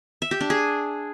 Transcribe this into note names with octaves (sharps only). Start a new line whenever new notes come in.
E5
G4
D4
G#4